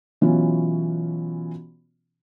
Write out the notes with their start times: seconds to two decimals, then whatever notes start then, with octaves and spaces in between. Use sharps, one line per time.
0.21 B2 E3 F#3 C#4 F4